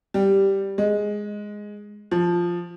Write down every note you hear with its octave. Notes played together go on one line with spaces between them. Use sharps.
G3
G#3
F3